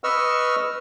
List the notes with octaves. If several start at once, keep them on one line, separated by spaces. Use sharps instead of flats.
B4 D#5 C#6 E6 F6